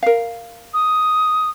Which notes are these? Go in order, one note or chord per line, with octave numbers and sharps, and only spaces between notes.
A#4 F5
D#6